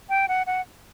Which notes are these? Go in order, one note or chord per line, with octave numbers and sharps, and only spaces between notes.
G5
F#5
F#5